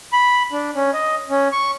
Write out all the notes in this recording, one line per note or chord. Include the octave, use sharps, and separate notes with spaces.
B5
D4
C#4
D#5
C#4
C#6